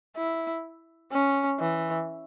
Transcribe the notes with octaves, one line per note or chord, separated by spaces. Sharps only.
E4
C#4
E3